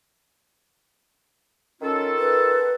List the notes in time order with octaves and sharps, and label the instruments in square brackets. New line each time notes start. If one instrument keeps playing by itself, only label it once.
[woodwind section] D#3 F4 A4 [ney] C#4
[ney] B4